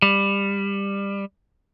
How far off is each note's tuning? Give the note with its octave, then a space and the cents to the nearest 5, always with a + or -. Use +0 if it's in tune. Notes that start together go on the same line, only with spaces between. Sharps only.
G3 +20